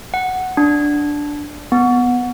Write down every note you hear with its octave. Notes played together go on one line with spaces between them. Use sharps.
F#5
D4
B3